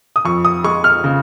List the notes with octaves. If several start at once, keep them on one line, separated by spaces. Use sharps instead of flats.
D#6
F2 C#6
D#6
G#3 C#6
F6
C#3